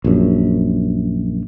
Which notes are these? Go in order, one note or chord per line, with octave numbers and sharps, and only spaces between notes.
A#1 F#2